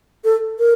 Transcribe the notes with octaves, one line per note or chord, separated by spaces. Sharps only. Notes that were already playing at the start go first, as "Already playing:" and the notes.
A4
A#4